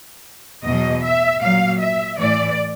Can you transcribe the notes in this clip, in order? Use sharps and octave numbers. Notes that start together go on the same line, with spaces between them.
E2 B2 F#3 D#5
E5
A#2 F#3 F5
E5
A2 E3 D5